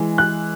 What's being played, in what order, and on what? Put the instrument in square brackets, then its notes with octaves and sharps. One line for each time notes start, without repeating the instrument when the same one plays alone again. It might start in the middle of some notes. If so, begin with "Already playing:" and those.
Already playing: [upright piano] E3 G#3
F#6